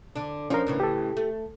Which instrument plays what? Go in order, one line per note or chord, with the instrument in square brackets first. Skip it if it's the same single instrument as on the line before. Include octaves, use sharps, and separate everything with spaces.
[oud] D3 D4
[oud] F3 F4 [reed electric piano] C#4 D4 A#4
[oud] A2 C#3 E3
[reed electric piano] G4 A4
[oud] A3